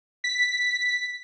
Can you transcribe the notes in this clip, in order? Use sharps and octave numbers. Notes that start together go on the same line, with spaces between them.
B6